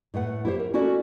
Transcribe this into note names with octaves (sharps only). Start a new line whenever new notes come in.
A2 A3 B4 F#5
E4 G4 C5
A#4
C#4 E4 F#4 A4 D5